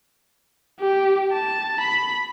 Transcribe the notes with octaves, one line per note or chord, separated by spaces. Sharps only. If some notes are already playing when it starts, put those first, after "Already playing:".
G4
A5
B5